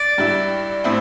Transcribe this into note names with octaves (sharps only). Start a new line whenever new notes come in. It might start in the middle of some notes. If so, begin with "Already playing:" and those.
Already playing: D5
G2 G3 E4
A2 A3 C4 E4